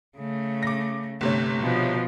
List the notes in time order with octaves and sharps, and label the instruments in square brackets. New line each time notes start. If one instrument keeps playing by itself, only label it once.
[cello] C#3 A3
[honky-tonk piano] D6 A#6
[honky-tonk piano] G1 C3 C#5 [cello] A3
[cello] B2 F3